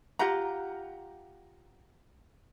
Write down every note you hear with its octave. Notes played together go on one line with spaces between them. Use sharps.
F4 G4 F#5 A#5